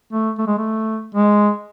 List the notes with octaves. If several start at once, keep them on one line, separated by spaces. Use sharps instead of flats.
A3
A3
G#3
A3
G#3